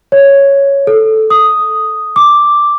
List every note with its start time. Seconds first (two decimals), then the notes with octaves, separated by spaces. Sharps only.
0.12 C#5
0.87 A4
1.30 D#6
2.16 D6